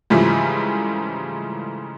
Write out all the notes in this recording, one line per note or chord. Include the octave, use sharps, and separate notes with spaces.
G#2 C#3 E3 F3 G3 A3